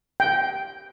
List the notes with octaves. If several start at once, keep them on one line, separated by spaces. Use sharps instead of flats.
G5